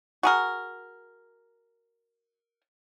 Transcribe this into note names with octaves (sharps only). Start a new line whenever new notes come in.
F#4 G#4 A#4